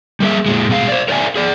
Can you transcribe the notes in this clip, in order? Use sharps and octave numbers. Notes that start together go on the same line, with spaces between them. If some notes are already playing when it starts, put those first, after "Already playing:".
G3 A#3 G#4 E5
A#2 G#3
B2 G#3 F5
C5 D5
A#4 C#5 D5 E5 G#5
G#4 D5